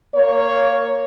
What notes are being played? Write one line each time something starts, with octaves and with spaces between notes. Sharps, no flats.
A#3 A#4 C#5